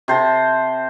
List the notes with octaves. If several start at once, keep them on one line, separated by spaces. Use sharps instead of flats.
C3 C5 A5